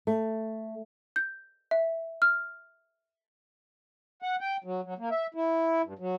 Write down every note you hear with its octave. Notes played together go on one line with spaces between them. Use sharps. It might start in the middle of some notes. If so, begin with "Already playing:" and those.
A3
G6
E5
F6
F#5
G5
F#3
F#3
A#3
E5
E4
G2
F#3